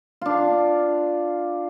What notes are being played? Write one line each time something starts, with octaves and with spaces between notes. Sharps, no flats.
D4 F4